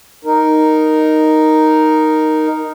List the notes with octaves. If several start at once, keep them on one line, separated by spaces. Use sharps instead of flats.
D#4 A#4